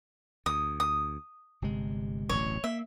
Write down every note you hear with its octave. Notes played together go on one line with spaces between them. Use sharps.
D2 D#6
D#6
G1 C3 G#3
D1 A1 B2 C#5
A#3 E5